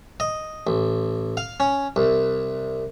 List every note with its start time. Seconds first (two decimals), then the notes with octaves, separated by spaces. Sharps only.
0.20 D#5
0.67 A1
1.37 F5
1.60 C#4
1.96 C2